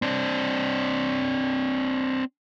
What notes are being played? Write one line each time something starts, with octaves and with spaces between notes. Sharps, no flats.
C4 D4